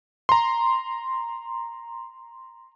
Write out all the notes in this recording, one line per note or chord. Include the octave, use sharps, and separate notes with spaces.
A#5 C6